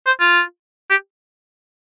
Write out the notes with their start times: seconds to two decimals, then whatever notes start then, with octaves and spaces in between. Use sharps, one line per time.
0.07 C5
0.20 F4
0.90 G4